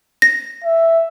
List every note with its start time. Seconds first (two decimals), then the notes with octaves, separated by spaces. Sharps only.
0.22 A#6
0.64 E5